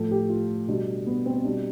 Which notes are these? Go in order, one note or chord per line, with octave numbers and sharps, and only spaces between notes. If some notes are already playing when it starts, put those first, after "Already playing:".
Already playing: A2 F3 A4
G4
F4
B2 G3 D4
B3
C4
B2 G3 D4